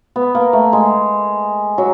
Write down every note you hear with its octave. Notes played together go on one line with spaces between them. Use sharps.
B3
A#3
A3
G#3
F#3